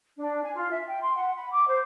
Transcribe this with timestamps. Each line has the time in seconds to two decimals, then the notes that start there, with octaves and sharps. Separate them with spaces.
0.18 D4
0.42 G#5
0.55 F4
0.70 E5
0.87 G5
1.01 C6
1.16 F#5
1.36 B5
1.51 D6
1.67 C5